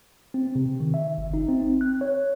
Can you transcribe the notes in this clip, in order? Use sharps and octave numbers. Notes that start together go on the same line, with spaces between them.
C4
C3
D#3
E5
G1
D#4
C4
F#6
C#5